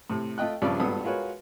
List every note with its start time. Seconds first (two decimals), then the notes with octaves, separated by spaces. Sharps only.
0.10 A2 C3
0.38 A3 F4 D#5 G5 F#6
0.62 A#1 G2 C#3 F3 B4 D5
0.80 G#1 G2 A#2 B3 A4 D#6
1.04 G#3 F4 F#4 A#4 B4 C#5